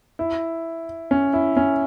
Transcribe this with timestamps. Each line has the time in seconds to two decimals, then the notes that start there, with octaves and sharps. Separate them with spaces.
0.19 E4
1.11 C#4
1.33 E4
1.57 C#4